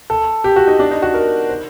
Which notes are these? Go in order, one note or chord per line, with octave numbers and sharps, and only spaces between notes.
A4
G4
F#4
D#4
D4
D#4
F#4
A#4
C5